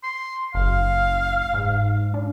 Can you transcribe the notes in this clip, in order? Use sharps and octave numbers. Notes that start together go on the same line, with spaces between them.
C6
F#1 F5
G#2
D4